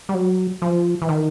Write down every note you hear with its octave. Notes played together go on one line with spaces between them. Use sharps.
G3
F#3
F3
E3
D#3